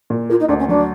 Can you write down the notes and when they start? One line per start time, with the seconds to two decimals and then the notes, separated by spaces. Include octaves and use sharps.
0.10 A#2
0.29 A#3 F4
0.39 D#4
0.48 D2 D4
0.59 C#4
0.69 F#3 D4